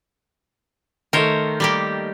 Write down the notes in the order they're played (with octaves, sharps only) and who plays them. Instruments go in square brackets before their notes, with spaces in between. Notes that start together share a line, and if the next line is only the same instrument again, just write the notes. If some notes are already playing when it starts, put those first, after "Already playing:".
[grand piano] D#3 A3 [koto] A#4 C5 C#5
[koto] G3 A#3 G4